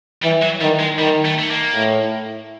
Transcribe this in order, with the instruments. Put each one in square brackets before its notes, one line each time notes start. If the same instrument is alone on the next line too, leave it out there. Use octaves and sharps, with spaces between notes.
[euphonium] E3 [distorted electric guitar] G3
[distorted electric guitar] F#3
[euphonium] D#3 [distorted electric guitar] G3
[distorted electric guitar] G#3
[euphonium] D#3 [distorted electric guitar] G3
[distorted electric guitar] A3
A3
A#3
[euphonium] A2